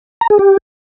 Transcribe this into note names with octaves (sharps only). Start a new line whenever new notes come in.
A#5
G#4
G4